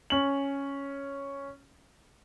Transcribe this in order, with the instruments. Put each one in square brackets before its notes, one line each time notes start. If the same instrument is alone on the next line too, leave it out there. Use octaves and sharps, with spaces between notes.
[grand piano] C#4 F#7